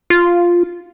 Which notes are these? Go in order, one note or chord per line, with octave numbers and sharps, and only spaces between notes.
F4